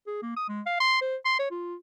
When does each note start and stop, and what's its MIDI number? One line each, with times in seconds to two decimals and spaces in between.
0.07 0.18 68
0.22 0.33 58
0.36 0.44 87
0.48 0.61 56
0.66 0.79 77
0.80 0.99 84
1.01 1.16 72
1.25 1.36 84
1.39 1.50 73
1.51 1.75 65